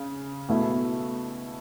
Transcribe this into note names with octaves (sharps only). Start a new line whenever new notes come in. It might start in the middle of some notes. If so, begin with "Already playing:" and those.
Already playing: C#3
B2 A3 E4